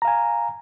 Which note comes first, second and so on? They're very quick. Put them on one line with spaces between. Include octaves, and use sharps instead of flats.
A#5 F5 G#5